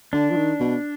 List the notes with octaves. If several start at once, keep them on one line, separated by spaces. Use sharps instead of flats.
D3 D4
F3
D#3
B2